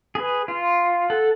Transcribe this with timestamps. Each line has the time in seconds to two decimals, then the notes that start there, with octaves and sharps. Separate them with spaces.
0.15 G#4 B4
0.48 F4
1.10 A4 F#5